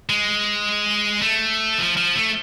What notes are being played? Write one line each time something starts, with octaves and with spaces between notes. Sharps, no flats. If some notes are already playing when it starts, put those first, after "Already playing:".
G#3
A3
F3
F3
A3